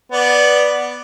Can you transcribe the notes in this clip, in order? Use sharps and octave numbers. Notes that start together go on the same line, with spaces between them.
B3 D5